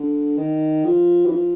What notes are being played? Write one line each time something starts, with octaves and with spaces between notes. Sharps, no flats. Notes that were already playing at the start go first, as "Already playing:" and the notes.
Already playing: D3
D#3
F3
E3
F3